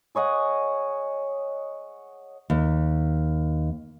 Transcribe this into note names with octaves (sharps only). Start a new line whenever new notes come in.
G#4 C#5 D#5 F#5
D#2